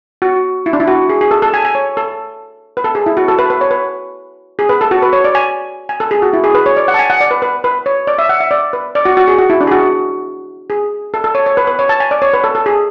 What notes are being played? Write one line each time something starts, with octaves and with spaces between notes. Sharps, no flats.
F#4
E4
D4
E4
F#4
G#4
G#4
A4
A4
G#5
G#5
C#5
A4
B4
A4
G#4
E4
F#4
A4
B4
B4
C#5
B4
G#4
B4
A4
F#4
B4
C#5
D5
G#5
G#5
A4
G#4
F#4
E4
G#4
B4
C#5
D5
F#5
A5
G#5
F#5
D5
B4
B4
B4
C#5
D5
E5
F#5
E5
D5
B4
D5
F#4
F#4
G#4
F#4
E4
D4
G#4
F#4
G#4
A4
A4
C#5
C#5
B4
B4
C#5
A5
G#5
D5
C#5
B4
A4
A4
G#4